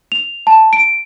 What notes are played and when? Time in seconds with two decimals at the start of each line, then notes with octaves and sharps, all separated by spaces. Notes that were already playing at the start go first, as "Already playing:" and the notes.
0.12 F7
0.47 A5
0.73 D7